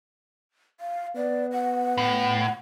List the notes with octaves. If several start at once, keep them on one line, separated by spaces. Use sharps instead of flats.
F5
B3 D5
F#5
A2